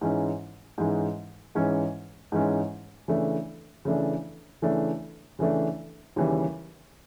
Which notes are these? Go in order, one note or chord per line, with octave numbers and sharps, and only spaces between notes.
G#2 E3 G#3 C#4
G#2 E3 G#3 C#4
G#2 E3 G#3 C#4
G#2 E3 G#3 C#4
C#3 E3 A3 D4
C#3 E3 A3 D4
C#3 E3 A3 D4
C#3 E3 A3 D4
D#2 C#3 E3 G3